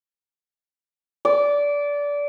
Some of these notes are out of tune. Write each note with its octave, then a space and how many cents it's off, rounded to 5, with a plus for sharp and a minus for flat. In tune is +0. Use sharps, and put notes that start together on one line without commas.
D5 -20